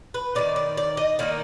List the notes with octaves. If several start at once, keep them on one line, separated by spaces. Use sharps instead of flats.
B4
D#3 G#3 D#4 D5
D5
D5
D#5
D#3 A#3 D#4 D5